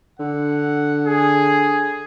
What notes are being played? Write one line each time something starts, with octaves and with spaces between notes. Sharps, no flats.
D3 F#5
G#4